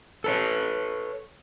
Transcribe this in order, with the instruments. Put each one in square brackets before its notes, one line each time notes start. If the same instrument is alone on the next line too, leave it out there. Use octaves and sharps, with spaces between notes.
[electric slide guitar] A4 B4 C#5